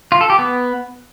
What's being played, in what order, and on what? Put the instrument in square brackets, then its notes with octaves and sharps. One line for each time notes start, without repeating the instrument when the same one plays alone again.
[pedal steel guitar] F4
A4
G4
B3